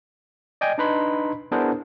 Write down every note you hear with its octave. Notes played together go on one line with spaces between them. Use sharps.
D5 D#5 G5 G#5
D4 D#4 B4 B5 C6
B3 D4 E4 G#4 A#4 C5